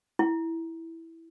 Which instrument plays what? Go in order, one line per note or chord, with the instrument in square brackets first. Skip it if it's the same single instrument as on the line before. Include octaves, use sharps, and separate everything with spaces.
[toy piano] E4